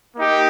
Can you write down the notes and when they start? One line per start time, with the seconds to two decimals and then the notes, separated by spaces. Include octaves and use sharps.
0.15 A#3 D#4 G4